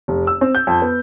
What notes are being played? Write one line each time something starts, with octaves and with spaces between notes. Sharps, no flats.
F1
E6
C4
G6
F2
B3